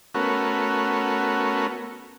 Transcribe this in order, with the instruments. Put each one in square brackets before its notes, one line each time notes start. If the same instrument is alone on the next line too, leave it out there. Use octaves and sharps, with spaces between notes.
[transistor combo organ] A3 B3 C#4 F#4 A#4